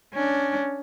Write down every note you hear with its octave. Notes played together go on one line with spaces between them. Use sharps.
C#4 D4